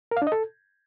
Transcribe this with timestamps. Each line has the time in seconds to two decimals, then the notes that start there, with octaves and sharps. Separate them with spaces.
0.11 A#4
0.17 F5
0.22 D4
0.27 D#5
0.32 A4